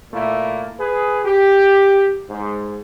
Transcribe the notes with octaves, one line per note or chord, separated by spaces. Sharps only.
A#2 A3 A#3 E4
G#4 B4
G4
G#2